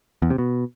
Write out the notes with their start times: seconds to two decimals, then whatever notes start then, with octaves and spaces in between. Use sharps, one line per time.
0.22 E2
0.30 C3
0.38 B2